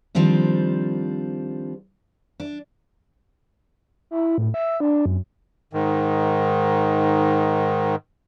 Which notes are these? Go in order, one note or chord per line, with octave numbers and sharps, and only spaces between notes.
D#3 F3 G3 C4 D4
D4
E4
A2
E5
D4
F#2
G#2 D#3